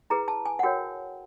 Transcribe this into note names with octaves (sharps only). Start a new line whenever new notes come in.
E4 G#4 B4 A#5
A5
G#5
F#5
F#4 A#4 C#5 G5